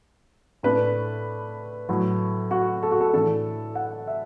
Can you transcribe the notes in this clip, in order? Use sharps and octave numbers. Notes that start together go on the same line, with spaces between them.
A2 A3 D4 B4
A2 F#3 A3
F#4
A4
F#4
A4
A2 E3 D4 A4
F#5
E5